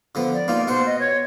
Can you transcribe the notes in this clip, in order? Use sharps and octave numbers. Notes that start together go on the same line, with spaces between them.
D3 F3 B3
D5
A#3 D#4 F4
B2 C5 F#5
D#5
C#5